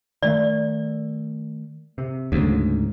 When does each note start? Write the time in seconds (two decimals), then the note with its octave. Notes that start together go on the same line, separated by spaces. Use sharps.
0.23 D#3 A3 D5
1.98 C3
2.32 D2 G#2 C#3